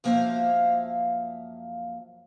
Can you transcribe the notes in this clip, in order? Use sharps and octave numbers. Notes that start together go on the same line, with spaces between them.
F#2 F3 A#3 C5 E5 F5